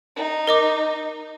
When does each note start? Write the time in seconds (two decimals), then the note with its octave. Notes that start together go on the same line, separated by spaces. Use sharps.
0.16 D#4
0.47 A#4 D#5 D6